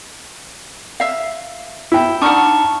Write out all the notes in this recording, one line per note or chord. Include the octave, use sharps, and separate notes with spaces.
E5 F5
E4 G5
D4 D#4 F#5 A5 C#6 F6